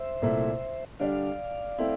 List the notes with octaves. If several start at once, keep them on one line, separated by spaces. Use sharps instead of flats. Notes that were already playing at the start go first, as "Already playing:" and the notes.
Already playing: C5 E5
C2 A#2 A3 E4
D3 G3 D4 D5 F5
A3 C4 E4